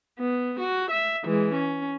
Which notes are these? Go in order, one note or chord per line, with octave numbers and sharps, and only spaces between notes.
B3
F#4
E5
E3 G#3
C#4